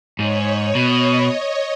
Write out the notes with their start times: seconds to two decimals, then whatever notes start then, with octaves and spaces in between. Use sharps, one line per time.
0.19 G#2 C#5
0.75 B2 D#5